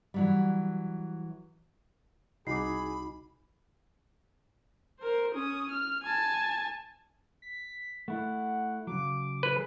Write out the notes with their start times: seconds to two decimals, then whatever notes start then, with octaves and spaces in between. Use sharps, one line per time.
0.14 E3 F#3 G3
2.47 C2 D#4 F#4 G#4 B5 D6 C7
4.99 A#4 C5
5.34 C#4 D#6
5.71 F6
6.03 G#5 A5
7.42 B6
8.08 A3 E4 F#5
8.87 C#3 F#3 D6
9.43 B4